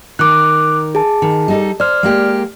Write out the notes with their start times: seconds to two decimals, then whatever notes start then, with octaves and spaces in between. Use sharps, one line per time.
0.19 D#3 A#4 D6 F#6
0.95 G#4 A5
1.22 D#3
1.48 G3 D#4 A4
1.80 C5 D5 F6
2.03 G#3 A#3 G4